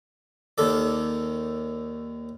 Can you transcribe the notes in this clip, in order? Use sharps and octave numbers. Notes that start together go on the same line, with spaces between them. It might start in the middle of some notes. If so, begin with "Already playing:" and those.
D#2 D#3 A4 D5